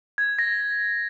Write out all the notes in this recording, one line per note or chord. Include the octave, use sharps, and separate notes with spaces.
G#6
A#6